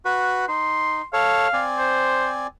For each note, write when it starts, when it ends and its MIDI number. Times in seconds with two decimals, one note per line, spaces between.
0.05 0.46 66
0.05 0.46 71
0.48 1.02 63
0.48 1.06 84
1.13 1.48 69
1.13 1.48 73
1.13 1.62 77
1.53 2.47 60
1.53 2.47 74
1.53 2.47 80
1.78 2.30 72